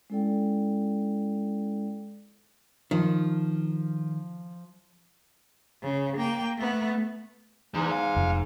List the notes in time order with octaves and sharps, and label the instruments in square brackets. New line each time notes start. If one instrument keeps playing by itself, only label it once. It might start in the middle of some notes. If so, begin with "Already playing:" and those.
[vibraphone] G#3 C#4 E4 A4 D5 G5
[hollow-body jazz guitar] D#3 [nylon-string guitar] F3
[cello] C#3
A#3 G5
A3 B3
[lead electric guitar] E2 [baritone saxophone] G#2
[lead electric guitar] F5
[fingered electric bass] F1